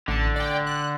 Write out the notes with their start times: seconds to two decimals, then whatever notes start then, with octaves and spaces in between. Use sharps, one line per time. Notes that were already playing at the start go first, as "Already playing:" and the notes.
0.08 A1 D3 A5
0.36 D5 G5
0.67 F#6